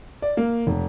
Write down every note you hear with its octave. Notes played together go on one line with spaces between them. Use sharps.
D5
A#3
F1